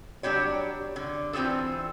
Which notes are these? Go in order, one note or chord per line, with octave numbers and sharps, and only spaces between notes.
F#3 G3 D4 G4 C#5
D3
E3 C4 F4 G#4 A4